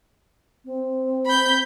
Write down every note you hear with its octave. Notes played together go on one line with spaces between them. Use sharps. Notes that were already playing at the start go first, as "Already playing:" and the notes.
C4
B5 G6